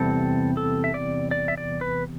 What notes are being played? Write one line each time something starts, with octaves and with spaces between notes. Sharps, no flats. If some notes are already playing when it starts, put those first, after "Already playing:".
Already playing: E2 C3 G3 C4 A4
A4
E5
D5
D5
E5
D5
B4